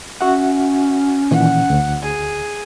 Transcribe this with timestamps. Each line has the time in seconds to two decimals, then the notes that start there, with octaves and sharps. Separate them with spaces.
0.21 C#4 F#4 E5 F#5
1.31 A#2 D#3 E3 F#5
1.70 D2
2.03 G#4